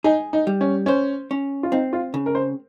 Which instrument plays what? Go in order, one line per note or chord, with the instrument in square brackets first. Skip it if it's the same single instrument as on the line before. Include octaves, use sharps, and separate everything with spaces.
[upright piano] D#4 [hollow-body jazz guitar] G#4
[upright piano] D#4
[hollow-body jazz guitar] G3
[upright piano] C#4
[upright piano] C#4 [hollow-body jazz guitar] C5
[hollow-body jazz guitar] C#4
[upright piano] F4
[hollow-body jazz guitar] C4 [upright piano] D#4
[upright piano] F4
[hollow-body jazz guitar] C#3
[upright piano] A#4
C5